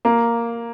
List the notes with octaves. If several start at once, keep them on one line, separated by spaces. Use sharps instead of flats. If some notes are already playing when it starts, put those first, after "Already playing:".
A#3